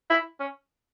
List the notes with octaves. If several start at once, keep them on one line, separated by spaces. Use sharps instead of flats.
E4
C#4